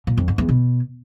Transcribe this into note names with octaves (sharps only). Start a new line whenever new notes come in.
A#2
F2
G#2
E2
B2